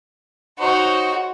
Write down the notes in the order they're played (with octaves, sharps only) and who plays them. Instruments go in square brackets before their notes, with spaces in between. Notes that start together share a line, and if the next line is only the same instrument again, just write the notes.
[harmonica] D#4 C5 C#5 [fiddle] F#4